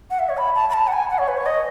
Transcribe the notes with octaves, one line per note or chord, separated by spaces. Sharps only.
F#5
E5
C#5
B5
A5
B5
A5
F#5
G#5
F#5
C#5
B4
C#5
D#5